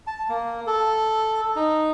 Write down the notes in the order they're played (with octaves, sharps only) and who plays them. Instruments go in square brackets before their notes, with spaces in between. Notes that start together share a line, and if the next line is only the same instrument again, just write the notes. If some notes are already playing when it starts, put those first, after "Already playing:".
[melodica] A5
A#3
A4
D#4